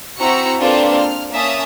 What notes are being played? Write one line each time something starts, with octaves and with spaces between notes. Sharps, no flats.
C4 E4 F#4 A#5 E6 C#7
A#3 C4 D4 F4 A4 B4
F6
A#3 C#4 E5 A5 D#6